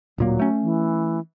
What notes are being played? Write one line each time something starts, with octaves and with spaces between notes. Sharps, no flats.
D1 A#2 F#3 A#3
A3 C#4
E3